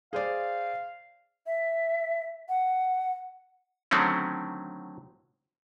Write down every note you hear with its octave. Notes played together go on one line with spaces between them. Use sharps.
G#4 C5 D5 F5
E5
F#5
D3 D#3 F#3 A3 C4 C#4